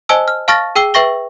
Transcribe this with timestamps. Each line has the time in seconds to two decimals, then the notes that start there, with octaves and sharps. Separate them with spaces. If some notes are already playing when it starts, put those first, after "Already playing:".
0.09 C5 D#5 G#5 A5 E6
0.28 F6
0.48 F5 A5 C#6 F6 A6 A#6
0.76 G#4 G5 E6 C7 G7
0.94 B4 E5 G5 C#6 A#6 G7